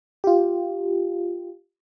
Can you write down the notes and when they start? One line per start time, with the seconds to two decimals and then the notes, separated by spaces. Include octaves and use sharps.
0.24 F4 G4